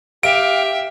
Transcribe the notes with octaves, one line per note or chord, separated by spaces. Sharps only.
G4 E5 F5 D7